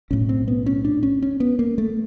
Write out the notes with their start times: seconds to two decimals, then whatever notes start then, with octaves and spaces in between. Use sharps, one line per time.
0.11 B1 A2 C#4
0.29 C4
0.48 B3
0.66 C#4
0.85 D4
1.03 C#4
1.22 C#4
1.40 B3
1.59 A#3
1.78 A3